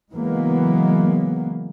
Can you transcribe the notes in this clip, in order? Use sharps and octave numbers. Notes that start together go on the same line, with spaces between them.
C#3 E3 F#3 G#3 A#3 B3